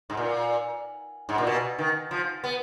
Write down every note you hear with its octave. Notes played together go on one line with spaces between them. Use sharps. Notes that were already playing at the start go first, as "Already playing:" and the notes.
G#2
A#2
G#2
A#2
B2
D#3
F3
B3